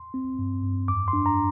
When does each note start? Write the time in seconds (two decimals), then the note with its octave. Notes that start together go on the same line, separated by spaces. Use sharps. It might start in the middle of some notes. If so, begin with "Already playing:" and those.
Already playing: C6
0.14 C4
0.39 G2
0.64 G2
0.88 F2 D6
1.08 C6
1.13 D4
1.26 A#5